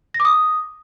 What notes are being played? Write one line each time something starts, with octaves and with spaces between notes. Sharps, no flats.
A#6
D6
D#6